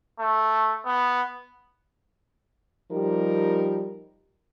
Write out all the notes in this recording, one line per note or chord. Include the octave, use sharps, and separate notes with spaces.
A3
B3
F3 G3 D#4 G4 A#4